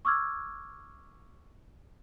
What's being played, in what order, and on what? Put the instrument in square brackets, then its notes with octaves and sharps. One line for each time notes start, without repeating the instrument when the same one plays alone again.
[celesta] C#6 D6 E6 F6 G#6